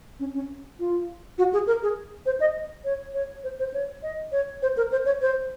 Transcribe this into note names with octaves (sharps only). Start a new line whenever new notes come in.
C#4
C#4
F4
F#4
G#4
A#4
G#4
C5
D#5
C#5
C#5
C5
C5
C#5
D#5
C#5
C5
A#4
C5
C#5
C5